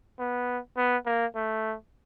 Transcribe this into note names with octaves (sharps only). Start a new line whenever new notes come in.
B3
B3
A#3
A3